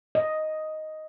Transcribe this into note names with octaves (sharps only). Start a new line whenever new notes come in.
D#5